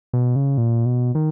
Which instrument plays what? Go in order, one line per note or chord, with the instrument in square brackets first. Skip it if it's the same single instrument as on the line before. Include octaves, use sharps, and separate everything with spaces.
[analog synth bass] B2
C#3
A#2
B2
D#3